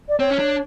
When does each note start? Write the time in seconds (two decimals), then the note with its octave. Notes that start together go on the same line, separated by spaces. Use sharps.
0.08 D5
0.19 C4 C#5
0.30 C#4
0.39 D4